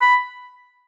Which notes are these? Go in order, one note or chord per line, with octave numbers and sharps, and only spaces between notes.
B5